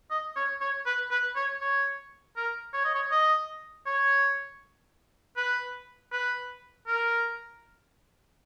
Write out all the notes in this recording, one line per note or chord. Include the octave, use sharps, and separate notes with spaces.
D#5
C#5
C#5
B4
B4
C#5
C#5
A#4
C#5
D#5
C#5
D#5
C#5
B4
B4
A#4